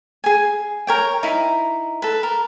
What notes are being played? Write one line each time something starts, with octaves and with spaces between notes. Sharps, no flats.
G#4 G#5
A#4 C#5 G5
D#4 E4
A4 B4
A#4